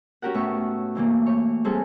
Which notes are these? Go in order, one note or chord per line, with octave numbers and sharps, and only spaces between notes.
C#4 F#4 G4 A#4 F#5
A2 B3 E5 C#6
C3 E3 A3 A#3
C#5
G3 C4 G#4 A4